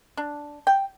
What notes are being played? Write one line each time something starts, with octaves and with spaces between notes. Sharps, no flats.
D4
G5